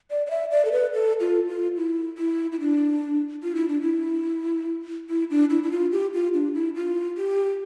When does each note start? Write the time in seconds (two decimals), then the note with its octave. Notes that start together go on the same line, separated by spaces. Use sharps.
0.11 D5
0.27 D5
0.30 E5
0.51 D5
0.65 A4
0.72 B4
0.94 A4
1.20 F4
1.48 F4
1.77 E4
2.18 E4
2.52 E4
2.60 D4
3.43 F4
3.55 E4
3.68 D4
3.81 E4
5.09 E4
5.30 D4
5.50 E4
5.63 E4
5.72 F4
5.92 G4
6.14 F4
6.34 D4
6.55 E4
6.75 F4
7.18 G4